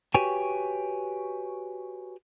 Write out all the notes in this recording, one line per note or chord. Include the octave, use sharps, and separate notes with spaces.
F#4 G4 B4 C#5 G5 G#5